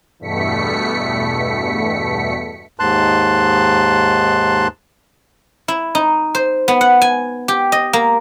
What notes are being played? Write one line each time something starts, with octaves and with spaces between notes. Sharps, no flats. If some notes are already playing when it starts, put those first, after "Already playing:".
E2 G2 B2 A3 B6 C#7
D#2 G#2 A5 C6 F#6
E4
D#4
C5
B3
F#5
G#5
G4
D#5
A#3